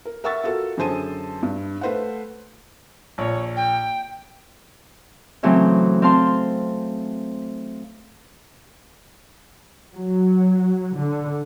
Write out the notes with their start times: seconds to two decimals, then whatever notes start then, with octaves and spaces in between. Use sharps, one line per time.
0.05 A#4
0.24 A#4 E5 F#5 C#6 E6 A6
0.44 F4 F#4 A4 A#4
0.78 F#2 D3 G#4 C5 A5 D#7
1.43 G2
1.81 A3 B4 C5 F5 F#5
3.18 A#1 C#5
3.57 G5
5.43 C#3 E3 F#3 A3 C4
6.02 C4 F5 A5 C6
9.95 F#3
10.96 D3